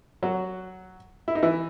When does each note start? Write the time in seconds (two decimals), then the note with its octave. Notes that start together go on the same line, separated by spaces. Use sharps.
0.23 F#3 F#4
1.28 E4
1.35 D#4
1.43 E3 E4